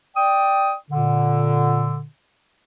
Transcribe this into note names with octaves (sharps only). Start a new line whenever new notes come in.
D5 G5 D#6
A#2 D3